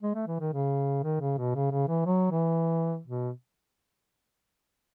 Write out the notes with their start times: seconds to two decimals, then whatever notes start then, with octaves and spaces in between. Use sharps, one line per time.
0.03 G#3
0.15 A3
0.27 E3
0.40 D#3
0.53 C#3
1.03 D#3
1.20 C#3
1.38 B2
1.55 C#3
1.71 C#3
1.88 E3
2.06 F#3
2.31 E3
3.07 B2